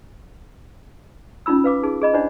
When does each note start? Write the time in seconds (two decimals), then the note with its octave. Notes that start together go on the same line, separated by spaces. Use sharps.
1.46 C#4 D#4 F4 B5 E6
1.64 B4 F5 D6
1.83 D#4 G#4
2.02 G#4 D#5 B5
2.14 D4 E4 C5 D5 F#5 B5